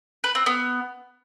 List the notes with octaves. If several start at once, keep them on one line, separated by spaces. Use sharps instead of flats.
B4
C4
B3